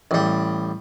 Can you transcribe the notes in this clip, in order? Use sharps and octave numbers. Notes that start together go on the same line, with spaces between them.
A1 G3